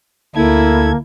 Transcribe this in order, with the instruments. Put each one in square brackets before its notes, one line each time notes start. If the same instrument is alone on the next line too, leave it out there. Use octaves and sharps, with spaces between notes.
[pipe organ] D2 A4 G#6 [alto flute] A#3 [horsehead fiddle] E4